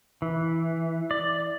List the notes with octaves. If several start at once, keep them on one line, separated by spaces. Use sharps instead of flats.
E3
D5